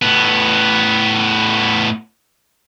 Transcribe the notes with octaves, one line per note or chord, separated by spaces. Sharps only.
A2 B3